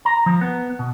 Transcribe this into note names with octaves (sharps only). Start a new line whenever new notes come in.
A#5
F3
B3
B2